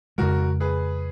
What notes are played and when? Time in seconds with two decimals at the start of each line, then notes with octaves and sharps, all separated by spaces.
0.18 F2 C#3 G#3 F#4 A#4
0.60 G#4 B4